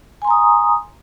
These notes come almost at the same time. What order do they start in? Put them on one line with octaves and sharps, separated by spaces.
G#5 C6 A#5 D#6